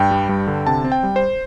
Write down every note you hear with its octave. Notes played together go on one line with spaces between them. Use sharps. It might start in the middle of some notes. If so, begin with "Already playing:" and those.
Already playing: G2 G5
G3
G2
D3
C3 A5
C4
G5
G3
C5